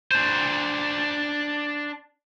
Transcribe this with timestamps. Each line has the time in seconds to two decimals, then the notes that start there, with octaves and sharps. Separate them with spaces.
0.12 D4 C5